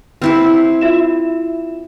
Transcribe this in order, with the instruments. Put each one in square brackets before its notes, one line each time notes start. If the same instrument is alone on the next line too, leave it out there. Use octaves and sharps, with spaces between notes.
[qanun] C4 E4 C5
[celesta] F4 E5 E7